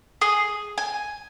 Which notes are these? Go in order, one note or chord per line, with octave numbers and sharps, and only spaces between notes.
G#4 D#6
G#5